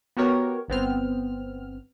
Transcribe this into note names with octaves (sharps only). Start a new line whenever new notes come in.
B3 F#4 G4 A#4 C#5
G1 B3 C4 F6